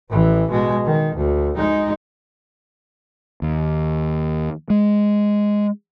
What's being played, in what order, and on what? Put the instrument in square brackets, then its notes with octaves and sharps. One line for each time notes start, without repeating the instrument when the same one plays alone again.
[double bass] A1 E3
B2 G#3
D#3
D2
G#3 D#4
[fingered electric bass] D#2
G#3